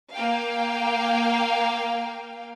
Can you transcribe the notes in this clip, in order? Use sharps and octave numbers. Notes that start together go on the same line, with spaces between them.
A#3 F5 G5